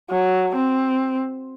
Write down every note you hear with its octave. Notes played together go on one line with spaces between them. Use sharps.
F#3
C4